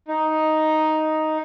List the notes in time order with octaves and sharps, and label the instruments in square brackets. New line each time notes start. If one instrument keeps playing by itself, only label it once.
[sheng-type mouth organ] D#4